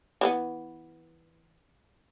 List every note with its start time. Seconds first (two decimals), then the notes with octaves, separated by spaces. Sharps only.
0.21 E3 G3 B3